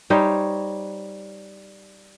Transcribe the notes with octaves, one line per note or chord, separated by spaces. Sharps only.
G3 D#4 C5 C#5